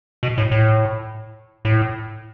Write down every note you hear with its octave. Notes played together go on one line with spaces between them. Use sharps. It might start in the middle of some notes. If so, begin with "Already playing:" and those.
B2
A2
A2
A2